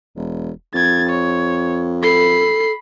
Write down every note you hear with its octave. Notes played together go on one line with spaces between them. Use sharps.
E1
F2 G#6 A6
C#5
A4 B5 C7